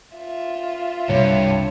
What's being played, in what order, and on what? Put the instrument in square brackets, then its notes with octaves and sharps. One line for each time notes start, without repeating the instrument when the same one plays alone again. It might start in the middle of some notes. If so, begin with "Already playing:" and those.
[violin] F4 E5
[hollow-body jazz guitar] C2 [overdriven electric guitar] G2 [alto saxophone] C#5